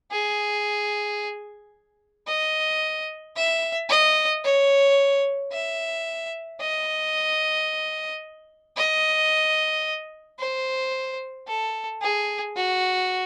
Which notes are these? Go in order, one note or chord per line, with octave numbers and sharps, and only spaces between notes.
G#4
D#5
E5
D#5
C#5
E5
D#5
D#5
C5
A4
G#4
F#4